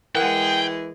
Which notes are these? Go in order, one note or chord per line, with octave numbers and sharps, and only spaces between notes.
E3 G#3 G#4 A#4 F#5 G5